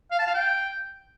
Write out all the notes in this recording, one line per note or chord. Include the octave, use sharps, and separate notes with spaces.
F5
A5
F5
G5